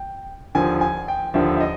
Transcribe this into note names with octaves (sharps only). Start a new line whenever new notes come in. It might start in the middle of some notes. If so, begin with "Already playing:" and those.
Already playing: G5
D#2 D3 F3 G#5
G#5
G5
D#2 D3 F3 E5
E5
D#5